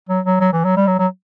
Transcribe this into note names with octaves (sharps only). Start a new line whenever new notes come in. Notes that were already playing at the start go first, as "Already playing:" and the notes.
F#3
F#3
F#3
E3
F#3
G3
F#3
F#3